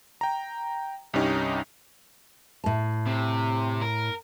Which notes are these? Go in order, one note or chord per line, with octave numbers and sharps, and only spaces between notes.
G5 A#5
C2 G2 C#4 D#4 G4
A2 A5
C3
A#4